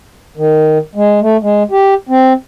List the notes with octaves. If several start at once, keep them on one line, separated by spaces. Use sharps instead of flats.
D#3
G#3
A3
G#3
G4
C4